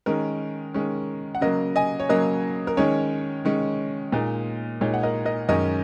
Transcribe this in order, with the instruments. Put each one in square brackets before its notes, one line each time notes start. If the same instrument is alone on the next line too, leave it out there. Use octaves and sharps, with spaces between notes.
[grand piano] D#3 G#3 C#4 A#4
D#3 G#3 C#4
F#5
C#3 F#3 A#3 A#4 D#5
D#5 G#5
C#5
C#3 F#3 A#3 A#4 D#5
A#4
D#3 G#3 C#4 C#5
D#3 G#3 C#4
A#2 G#3 D#4 A#4
A#2 G#3 D#4 C#5
F#5
A#4 D#5
A#4 D#5
F#2 D#3 G#3 C#4 A#4 D#5